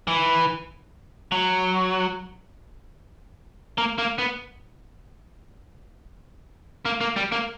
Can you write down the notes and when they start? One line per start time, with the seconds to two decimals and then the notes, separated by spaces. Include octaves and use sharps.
0.08 E3
1.32 F#3
3.78 A#3
3.98 A#3
4.18 B3
6.85 A#3
7.01 A#3
7.16 G3
7.32 A#3